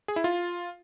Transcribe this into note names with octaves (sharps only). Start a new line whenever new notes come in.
G#4
E4
F4